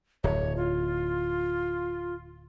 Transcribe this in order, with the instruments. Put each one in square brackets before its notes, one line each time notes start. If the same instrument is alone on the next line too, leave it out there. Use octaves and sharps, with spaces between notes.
[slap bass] D1 [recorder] C#5
[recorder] F4